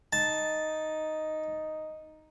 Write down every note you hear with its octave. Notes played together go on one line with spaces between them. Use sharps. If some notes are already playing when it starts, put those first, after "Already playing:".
D#4 A5